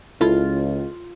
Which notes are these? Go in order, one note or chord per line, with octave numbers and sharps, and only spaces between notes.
C#2 E4 F4 A4